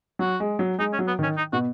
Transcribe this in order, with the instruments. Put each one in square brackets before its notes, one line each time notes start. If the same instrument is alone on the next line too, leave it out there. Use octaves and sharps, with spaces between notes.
[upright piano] F#3 [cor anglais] F#4
[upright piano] G#3
F#3
[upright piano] G#3 [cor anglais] D#4
[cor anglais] C#4
[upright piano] F#3
[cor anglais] B3
[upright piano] D#3 [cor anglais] C#4
[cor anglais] D#4
[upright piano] B2 [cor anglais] F#4